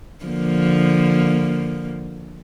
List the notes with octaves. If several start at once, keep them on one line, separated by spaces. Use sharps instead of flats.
D3 F3 A#3